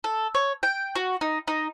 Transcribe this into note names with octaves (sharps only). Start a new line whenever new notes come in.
A4
C#5
G5
F#4
D#4
D#4